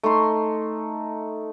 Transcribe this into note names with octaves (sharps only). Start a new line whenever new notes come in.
A3 D#4 C6